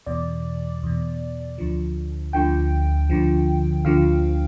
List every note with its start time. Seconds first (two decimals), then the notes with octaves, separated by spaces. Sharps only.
0.06 E2 B2 D5
0.83 E2 B2
1.58 D2 D3 F3
2.33 D2 D3 F3 G5
3.10 D2 D3 F3
3.85 D2 D3 F3 F5